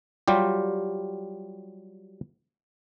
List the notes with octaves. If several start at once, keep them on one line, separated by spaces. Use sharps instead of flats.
F#3 G3 F4 G4